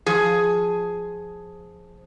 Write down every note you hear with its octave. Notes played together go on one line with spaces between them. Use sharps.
F3 G#4